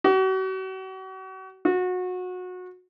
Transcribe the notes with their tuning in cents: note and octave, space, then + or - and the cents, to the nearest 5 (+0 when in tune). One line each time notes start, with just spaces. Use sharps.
F#4 +40
F#4 -25